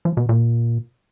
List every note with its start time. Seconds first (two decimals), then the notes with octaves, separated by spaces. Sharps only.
0.05 F3
0.17 B2
0.29 A#2